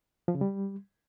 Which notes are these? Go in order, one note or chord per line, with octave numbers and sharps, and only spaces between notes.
F3
C#3
G3